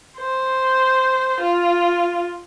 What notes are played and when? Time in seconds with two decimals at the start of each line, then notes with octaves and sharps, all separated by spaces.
0.18 C5
1.40 F4